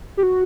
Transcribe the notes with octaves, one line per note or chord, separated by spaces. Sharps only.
G4
F#4